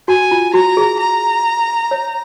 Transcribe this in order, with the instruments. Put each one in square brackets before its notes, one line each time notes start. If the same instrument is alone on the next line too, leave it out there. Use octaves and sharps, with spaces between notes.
[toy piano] F#4 [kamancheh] G#5
[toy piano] F4
[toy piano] F#4 [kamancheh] A#5
[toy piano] G#4
[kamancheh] A#5
[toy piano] C#5